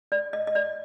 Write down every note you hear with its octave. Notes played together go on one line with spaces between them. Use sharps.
D5
D#5
D#5
D5